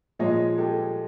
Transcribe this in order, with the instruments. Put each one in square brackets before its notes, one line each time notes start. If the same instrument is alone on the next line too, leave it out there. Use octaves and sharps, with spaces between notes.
[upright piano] A#2 F3 G#3 C#5 D#5
G4 A4